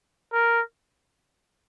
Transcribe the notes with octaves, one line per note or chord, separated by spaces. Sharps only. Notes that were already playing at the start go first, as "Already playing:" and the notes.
A#4